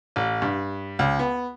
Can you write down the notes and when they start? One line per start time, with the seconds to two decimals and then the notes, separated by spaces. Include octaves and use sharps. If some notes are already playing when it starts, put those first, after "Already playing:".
0.16 A1
0.42 G2
0.99 C#2
1.19 B3